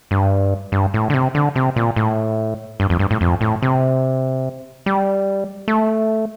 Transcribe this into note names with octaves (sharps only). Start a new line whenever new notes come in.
G2
G2
A2
D3
C3
D3
C3
A#2
A2
G2
F2
G2
A2
F2
A2
C3
G3
A3